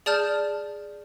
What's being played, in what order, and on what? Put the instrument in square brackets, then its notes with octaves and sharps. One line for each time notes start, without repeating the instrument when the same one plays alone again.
[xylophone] G#4 D5 A5 F6 G6